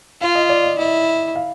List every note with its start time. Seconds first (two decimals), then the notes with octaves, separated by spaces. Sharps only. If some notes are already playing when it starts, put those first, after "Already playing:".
0.21 F4 F5
0.35 D#5
0.50 D5
0.64 D#5
0.78 E4 D#5
1.36 F5